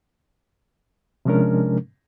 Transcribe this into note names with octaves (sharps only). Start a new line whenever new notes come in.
C3 F3 G#3 C#4 D4 A#4